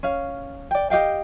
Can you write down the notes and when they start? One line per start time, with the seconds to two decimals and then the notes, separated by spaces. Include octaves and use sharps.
0.03 C#4 F5
0.71 D5 G5
0.90 G4 D#5 F5 G5